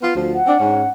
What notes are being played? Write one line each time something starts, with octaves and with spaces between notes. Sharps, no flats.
B3 F4
D2 F3
F#5
C4 D4
G#2 C#4